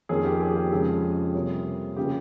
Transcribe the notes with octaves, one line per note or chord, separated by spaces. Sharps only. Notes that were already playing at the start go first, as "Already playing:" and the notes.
F2 D#3 A#3 C#4 G#4
G4
G#4
G4
F2 C#3 G#3 C#4 G#4
C3 G3 A#3 C#4
C#3 F3 A#3 G4